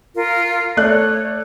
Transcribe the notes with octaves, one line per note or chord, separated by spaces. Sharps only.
F4 A#4
A3 C#5 D5 F#6